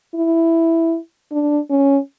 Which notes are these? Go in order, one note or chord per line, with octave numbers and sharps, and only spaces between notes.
E4
D4
C#4